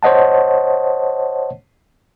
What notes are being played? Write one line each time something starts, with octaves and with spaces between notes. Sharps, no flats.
C5 C#5 D#5 F#5 A5